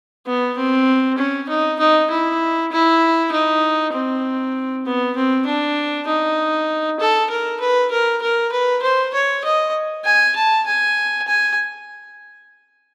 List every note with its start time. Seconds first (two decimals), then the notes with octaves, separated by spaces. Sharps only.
0.27 B3
0.57 C4
1.18 C#4
1.49 D#4
1.79 D#4
2.10 E4
2.72 E4
3.32 D#4
3.93 C4
4.86 B3
5.16 C4
5.46 D4
6.07 D#4
7.00 A4
7.30 A#4
7.60 B4
7.91 A#4
8.22 A#4
8.52 B4
8.83 C5
9.14 C#5
9.44 D#5
10.05 G#5
10.36 A5
10.66 G#5
11.27 G#5